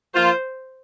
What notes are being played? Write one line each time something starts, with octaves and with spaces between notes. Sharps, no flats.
F3 A#3 F4 C5